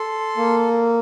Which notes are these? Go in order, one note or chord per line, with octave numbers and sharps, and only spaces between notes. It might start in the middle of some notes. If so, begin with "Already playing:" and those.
Already playing: A4 C6
A#3